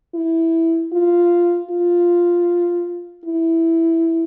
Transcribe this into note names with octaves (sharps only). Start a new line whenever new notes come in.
E4
F4
F4
E4